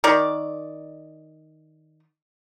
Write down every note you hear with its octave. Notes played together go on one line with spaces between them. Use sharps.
D#3 A#4 D5